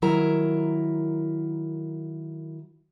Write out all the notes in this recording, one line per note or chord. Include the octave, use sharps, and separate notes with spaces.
D#3 F#3 E4 A#4 A#5